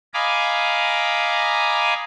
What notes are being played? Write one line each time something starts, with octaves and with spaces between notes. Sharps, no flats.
D#5 F5 G#5 A#5 B5 D6